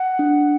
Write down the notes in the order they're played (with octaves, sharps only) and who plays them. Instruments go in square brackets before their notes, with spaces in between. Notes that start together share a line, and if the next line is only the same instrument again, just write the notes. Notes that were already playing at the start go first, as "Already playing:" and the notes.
Already playing: [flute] F#5
[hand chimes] D4